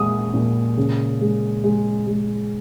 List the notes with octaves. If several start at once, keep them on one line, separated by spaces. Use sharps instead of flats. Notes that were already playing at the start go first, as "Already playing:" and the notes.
Already playing: A#2 G#3 D#6
A#2
C#3
G#3
G#3
G#3